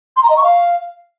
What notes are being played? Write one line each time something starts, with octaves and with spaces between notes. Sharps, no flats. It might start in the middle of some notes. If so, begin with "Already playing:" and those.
C6
A#5
D#5
C#6
F5